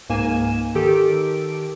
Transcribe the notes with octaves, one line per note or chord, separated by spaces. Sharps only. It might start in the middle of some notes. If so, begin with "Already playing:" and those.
C#2 G#2 A#3 G#5 E7
D#3 G4 A4 D7